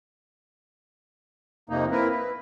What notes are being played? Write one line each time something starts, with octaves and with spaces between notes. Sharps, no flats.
F2 C3 A#3 D#4
A#3 C4 E4 A#4 B4
B4